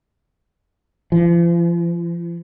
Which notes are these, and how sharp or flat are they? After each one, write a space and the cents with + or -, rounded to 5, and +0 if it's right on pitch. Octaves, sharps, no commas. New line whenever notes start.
F3 -40